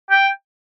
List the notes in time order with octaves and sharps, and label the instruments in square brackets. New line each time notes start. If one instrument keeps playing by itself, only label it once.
[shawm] G5